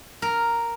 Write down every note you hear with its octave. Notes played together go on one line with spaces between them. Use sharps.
A#4